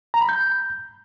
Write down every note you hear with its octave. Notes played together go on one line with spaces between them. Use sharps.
A#5
B5
G6